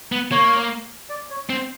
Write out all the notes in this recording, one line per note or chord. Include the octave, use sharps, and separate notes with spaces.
B3
A#3 C#5
D5
C#5
C4 C5